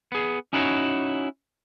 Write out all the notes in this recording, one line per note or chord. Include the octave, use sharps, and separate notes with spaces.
B3 G#4
C#4 D#4 E4 F#4 C#5